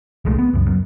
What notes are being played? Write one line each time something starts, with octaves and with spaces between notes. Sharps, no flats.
D#1 C2 G#3 A3
B3
C#2 F#2
F#2